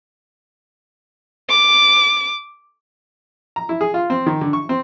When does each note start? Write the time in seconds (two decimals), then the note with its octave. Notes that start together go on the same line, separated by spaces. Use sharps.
1.49 D6
3.56 A#5
3.69 E4
3.81 G#4
3.94 F4
4.10 C4
4.26 D#3
4.41 D3
4.53 C#6
4.69 C4